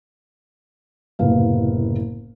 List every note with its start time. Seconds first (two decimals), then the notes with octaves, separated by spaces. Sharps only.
1.19 F#1 A2 C3 B3 F5